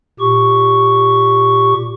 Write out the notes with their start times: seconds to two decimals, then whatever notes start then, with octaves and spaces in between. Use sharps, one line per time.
0.20 A#2 G4 C#6